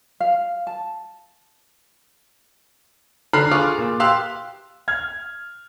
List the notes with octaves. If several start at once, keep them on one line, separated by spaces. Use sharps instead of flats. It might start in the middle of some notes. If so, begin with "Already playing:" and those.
F5
A5
D3 A#5 B5 F6 F#6 C7
F4 G#4 G#5 C#6 D6 F6
A#2
G4 F5 C6 E6 F#6
F6 G#6